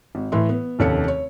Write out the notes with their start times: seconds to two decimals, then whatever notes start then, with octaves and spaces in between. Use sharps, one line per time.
0.15 G#1
0.32 A2 E3 E5 C6
0.49 B3
0.79 F1 D#2 C#4 A4 C#7
1.08 C#5